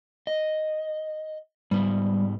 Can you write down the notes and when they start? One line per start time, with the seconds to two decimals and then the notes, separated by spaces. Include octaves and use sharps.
0.27 D#5
1.71 G#2 G3 B3